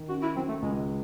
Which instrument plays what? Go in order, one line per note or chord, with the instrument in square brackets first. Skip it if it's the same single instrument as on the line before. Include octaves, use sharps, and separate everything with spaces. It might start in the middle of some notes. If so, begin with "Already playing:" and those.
Already playing: [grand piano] D#3
[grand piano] C#4 [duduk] F#4
[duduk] E4
[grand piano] F#3 [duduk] C4
[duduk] A3
[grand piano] C#2 [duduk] G#3